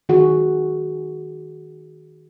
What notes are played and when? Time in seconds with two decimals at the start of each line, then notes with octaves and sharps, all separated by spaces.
0.09 D#3 F#4 G#4